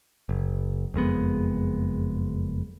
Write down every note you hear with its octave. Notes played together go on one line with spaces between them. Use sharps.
F#1
F#1 F2 G#3 B3